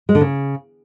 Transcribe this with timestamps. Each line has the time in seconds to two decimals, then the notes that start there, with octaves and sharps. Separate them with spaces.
0.09 G#3
0.15 D3
0.21 C#3